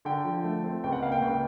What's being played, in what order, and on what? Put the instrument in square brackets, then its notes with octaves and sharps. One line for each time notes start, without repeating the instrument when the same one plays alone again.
[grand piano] D3 G5
F3
A3
C4
C#2 G5
F#5
A#3 F5
G5
C#2